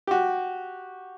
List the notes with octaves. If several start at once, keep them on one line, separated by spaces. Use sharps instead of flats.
F#4 G4